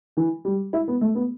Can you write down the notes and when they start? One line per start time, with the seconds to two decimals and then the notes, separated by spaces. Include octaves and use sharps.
0.17 E3
0.45 G3
0.73 E4
0.88 B3
1.01 A3
1.15 B3